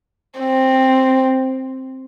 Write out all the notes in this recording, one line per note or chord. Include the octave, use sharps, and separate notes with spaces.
C4